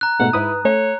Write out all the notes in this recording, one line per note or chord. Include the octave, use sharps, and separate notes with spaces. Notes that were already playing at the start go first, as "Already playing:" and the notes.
A#5 F#6
G#2 B2 A3 F#5
G#2 E4 B4 D#6
A3 C#5